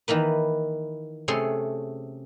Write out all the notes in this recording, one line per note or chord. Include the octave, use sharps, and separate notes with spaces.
D#3 E3 A#3 B4
C3 A3 C#4 G#4 A4 C6